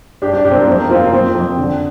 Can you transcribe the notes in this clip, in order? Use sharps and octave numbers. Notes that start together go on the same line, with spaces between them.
G2 D4 G4
D4 G4
G2 D4 G4
C4
A#3
F2 C4
A#3
F2 C4 F4
A#3
F2 C4
F2
D3